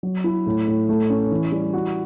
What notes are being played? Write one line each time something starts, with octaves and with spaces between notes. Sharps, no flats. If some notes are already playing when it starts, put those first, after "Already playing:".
F#3
E4
A2
A2
A3
C#4
E3
G3
F#4